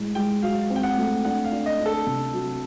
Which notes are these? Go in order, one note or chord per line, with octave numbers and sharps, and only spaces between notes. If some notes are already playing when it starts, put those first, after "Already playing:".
Already playing: A2 G#3
G#3 G5
F#3 F5
C4
G5
F#5
A3
D4 F#5
F5
D4
D#5
D4
A4
C3
F#3